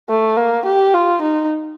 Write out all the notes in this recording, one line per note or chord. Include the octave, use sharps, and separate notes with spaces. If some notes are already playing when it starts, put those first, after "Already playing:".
A3
A#3
G4
F4
D#4